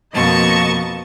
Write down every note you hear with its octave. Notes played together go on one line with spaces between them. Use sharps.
F2 B2 A#3 D#5 A5 C#6